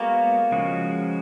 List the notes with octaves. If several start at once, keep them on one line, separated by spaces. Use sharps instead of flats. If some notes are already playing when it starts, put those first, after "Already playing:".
Already playing: G#3 A#3 B3 F#4 A#4 C#5
C#3 F3 G#3 C#4 F#4